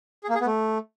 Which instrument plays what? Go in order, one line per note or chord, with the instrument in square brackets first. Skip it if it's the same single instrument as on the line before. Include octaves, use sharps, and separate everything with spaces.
[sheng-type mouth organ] G#4
A#3
G#4
B3
A3